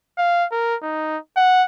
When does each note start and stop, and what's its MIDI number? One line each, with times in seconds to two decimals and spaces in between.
0.18 0.45 77
0.52 0.75 70
0.82 1.18 63
1.36 1.64 78